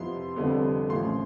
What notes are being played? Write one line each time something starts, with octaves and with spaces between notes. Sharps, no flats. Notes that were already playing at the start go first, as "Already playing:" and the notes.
Already playing: F2 C3 F3 B3 E4 C6
F1 F2 D3 G3 B3
A1 A2 F3 C6